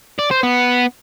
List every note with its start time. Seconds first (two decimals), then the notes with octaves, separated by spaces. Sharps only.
0.19 D5
0.31 C5
0.43 B3